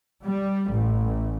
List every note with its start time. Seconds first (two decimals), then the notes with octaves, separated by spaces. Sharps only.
0.23 G3
0.72 A1